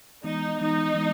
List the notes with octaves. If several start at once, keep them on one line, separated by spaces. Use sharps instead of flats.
E3 G#3 B3 D#4
E3 G#3 B3 D#4
E3 G#3 B3